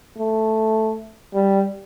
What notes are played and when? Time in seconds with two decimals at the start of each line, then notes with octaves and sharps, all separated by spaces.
0.17 A3
1.34 G3